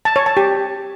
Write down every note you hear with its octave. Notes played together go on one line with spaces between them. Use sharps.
A5
C#5
A5
G4